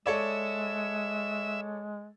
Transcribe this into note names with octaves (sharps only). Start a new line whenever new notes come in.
G#3 A4 C#5 D5 E5